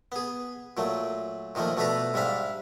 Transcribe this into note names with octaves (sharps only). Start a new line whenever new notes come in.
B3 G#4
A#2 F#3 A3
A#2 D#3 F3 A3 A#3
B2 A3 D4 A4 B4 A#5
G#2 G3 D4 E5 F5